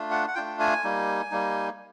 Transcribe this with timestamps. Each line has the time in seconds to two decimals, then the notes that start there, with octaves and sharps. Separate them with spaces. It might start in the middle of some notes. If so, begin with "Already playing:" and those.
Already playing: A3 D4 F4
0.11 F#5
0.28 F#5
0.35 A3 D4 F4 G5
0.60 G#5
0.84 G3 A#3 D#4
1.31 G3 A#3 D#4